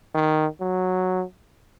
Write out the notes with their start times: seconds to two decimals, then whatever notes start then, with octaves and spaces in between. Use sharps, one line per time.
0.14 D#3
0.60 F#3